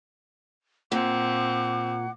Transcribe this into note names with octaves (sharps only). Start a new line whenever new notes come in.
A#2 C4 F#5 D6